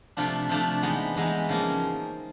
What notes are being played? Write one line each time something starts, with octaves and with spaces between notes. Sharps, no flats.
C3 F3 A3 D4 F4
C3 F3 A3 D4 F4
E3 G#3 B3 D#4
E3 G#3 B3 D#4
C#3 F3 A#3